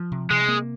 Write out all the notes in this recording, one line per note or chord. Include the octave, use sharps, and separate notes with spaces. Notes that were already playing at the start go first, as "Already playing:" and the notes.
Already playing: F3
C3
C3 G#3
A#3